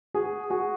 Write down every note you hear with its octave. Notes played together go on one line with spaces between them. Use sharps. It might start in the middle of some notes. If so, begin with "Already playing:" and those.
F#4 G#4
F#4 G#4